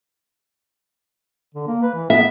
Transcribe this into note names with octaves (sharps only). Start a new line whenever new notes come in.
D3
A#3
B4
E3
B3 E5